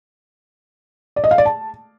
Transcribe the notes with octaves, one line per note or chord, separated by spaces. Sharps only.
D5
D#5
F5
D5
A5